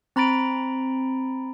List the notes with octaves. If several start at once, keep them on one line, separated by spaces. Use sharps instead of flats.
C4 A#5 B5 A6 D7